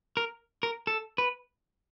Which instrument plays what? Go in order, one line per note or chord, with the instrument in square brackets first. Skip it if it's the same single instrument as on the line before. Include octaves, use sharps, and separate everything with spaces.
[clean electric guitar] A#4
A#4
A4
B4